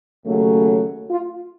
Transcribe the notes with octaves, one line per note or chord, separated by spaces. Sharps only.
D#2 C#3 F#3 A3
F4